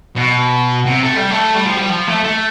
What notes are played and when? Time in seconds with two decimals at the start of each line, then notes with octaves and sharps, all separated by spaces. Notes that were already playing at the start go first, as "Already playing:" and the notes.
0.16 B2
0.86 C3
1.03 A3
1.17 G3
1.31 A3
1.55 G3
1.66 F3
1.77 G3
1.90 F3
2.08 A3
2.24 A3